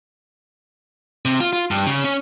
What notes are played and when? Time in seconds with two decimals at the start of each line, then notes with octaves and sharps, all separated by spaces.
1.25 C3
1.40 F4
1.53 F4
1.71 G2
1.87 C#3
2.04 C#4